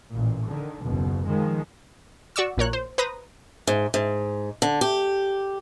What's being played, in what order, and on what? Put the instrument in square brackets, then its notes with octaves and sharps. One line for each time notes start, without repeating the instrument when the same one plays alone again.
[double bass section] A1 A#2
D3 D#3
F#1 D#2 B2
D#3 F3 G#3
[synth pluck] F#4 D5 C#6 E6
A#1 A#2 A#4 C#5 F#6
C5
B4 C5 A#5 D#6 A#6
[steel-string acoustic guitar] G#2
G#2
D3
G4